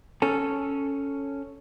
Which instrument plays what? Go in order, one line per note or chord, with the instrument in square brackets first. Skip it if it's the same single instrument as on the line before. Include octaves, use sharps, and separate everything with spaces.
[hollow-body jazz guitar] C#4 A4